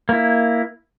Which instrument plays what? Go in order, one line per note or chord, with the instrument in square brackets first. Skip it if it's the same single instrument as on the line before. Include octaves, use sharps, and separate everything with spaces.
[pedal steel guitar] A#3 E4